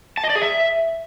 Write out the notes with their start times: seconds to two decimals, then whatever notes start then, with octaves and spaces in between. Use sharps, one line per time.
0.18 A5
0.24 D#5
0.30 D5
0.36 G#4
0.42 E5